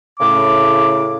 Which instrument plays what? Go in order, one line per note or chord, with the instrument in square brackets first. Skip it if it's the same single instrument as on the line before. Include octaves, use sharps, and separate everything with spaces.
[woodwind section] A2 C#3 [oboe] D6